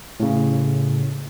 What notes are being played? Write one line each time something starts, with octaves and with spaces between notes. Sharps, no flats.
A2 C#3